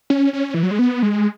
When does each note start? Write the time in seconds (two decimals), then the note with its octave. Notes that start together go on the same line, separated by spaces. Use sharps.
0.10 C#4
0.33 C#4
0.54 E3
0.63 F#3
0.71 G#3
0.79 B3
1.03 G#3